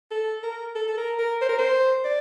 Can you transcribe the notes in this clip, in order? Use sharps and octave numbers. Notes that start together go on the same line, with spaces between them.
A4
A#4
A4
A4
A#4
A#4
C5
A#4
C5
D5